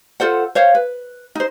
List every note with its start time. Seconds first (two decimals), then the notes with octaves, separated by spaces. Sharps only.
0.20 F4 A4 C5 F#5
0.55 C5 C#5 F5
0.75 B4
1.35 D#4 C5